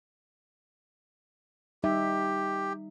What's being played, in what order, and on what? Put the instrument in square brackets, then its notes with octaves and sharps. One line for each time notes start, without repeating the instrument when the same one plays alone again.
[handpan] G3 D#4 E5 [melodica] G4